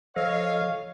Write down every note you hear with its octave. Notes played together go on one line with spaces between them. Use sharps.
F3 A4 C#5 D#5 F5